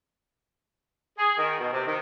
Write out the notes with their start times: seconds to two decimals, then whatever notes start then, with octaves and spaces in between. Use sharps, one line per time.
1.18 G#4
1.38 D#3
1.59 B2
1.73 C3
1.86 D#3